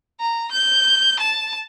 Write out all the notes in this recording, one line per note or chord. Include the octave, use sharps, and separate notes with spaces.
A#5
G6
A5